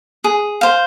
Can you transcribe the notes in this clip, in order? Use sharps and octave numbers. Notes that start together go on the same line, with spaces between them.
G#4
C5 F5